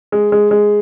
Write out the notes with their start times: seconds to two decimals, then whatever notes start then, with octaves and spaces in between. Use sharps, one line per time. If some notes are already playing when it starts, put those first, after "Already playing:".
0.12 G#3
0.32 G#3
0.51 G#3